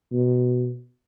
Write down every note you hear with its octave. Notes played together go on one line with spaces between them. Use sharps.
B2